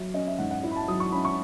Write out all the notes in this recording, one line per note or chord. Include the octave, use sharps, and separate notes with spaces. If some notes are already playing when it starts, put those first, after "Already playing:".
Already playing: F#3 E5
C#4 D#5
E5
G#2 F#5
F#5
E4
B5
A5
F#3 D#6
C#6
C#4 B5
C#6